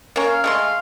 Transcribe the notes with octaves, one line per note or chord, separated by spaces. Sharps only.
A#3 C#4
F5
G#3 A3 C6